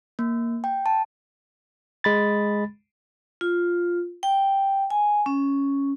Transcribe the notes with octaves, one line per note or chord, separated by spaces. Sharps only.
A#3
G5
A5
G#3 B5 A6
F4
G5
G#5
C#4